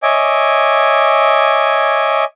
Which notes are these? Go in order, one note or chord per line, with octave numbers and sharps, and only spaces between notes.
C#5 D#5 E5 G#5 D6